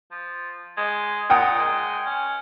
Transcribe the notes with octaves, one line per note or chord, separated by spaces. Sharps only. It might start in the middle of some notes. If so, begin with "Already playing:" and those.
F3
G#3
A#2 F#5 G5 D#6
G#3
C#4